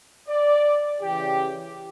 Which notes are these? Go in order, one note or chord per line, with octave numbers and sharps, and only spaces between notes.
D5
C#3 E3 G4